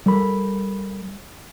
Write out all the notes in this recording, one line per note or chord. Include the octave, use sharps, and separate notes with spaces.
G3 A4 A#4 B5